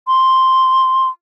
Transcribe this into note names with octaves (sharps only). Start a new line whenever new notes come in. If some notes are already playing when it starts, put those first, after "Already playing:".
C6